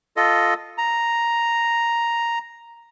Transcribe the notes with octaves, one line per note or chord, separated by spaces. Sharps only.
F4 A4 D#5
A#5